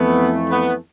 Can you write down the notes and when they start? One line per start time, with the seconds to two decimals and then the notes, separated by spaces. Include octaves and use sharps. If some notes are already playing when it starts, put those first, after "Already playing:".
Already playing: F2 E3 A3 B3
0.51 B3